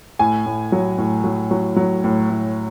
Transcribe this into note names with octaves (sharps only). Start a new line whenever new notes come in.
A2 G#5
A2
F#3
A2
F#3
F#3
F#3
A2
A2